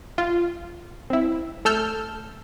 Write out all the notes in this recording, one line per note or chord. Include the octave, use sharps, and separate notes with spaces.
F4
C4 E4
A3 A4 E6 F6 G6